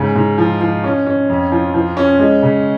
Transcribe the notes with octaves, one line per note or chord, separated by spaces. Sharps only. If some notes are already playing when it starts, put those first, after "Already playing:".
Already playing: G#2 C#3
G#2
F3
F3
C#4
C#4
F2
F3
F3
C#4
G#3
C#3